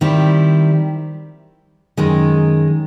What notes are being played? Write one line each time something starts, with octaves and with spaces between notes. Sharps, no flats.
D#3 G3 C4 E4
F#2 D#3 G#3